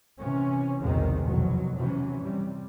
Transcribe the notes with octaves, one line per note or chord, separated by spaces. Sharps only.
C3 E3 C#4
B1 E2 C3 D#3 G#3
F1 B2 F#3
C3 E3 F#3 C#4
C3 G3